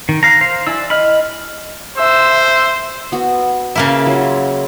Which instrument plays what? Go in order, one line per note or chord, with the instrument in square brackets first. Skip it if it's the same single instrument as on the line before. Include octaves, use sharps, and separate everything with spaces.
[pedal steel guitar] D#3
[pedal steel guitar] F5 A#5 [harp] F#6 G6
[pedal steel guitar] C5 F5
[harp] E4 G#5 [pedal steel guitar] D5 E6
[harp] D#5 [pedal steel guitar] B5 F6
[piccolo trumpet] C5 [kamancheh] E5 E6
[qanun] B3 F#4
[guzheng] C#3 A#3 E4
[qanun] F#3 F4